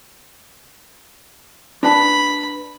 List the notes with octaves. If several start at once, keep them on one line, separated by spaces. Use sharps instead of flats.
D4 B4 A5 B5